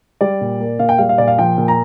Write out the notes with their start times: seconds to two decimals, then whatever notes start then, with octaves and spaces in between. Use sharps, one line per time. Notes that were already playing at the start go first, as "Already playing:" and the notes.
0.21 G3 D5
0.41 A#2
0.60 A#3
0.79 A#2 F5
0.89 G5
0.98 G3 F5
1.09 F5
1.18 A#2 D5
1.28 F5
1.38 F3 G5
1.58 A#2
1.68 A#5